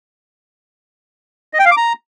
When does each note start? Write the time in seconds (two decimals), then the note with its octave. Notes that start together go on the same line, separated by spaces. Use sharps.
1.53 D#5
1.59 G5
1.65 F5
1.71 D6
1.77 A#5